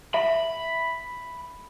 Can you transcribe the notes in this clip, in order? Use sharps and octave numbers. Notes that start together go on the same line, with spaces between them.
E5 B5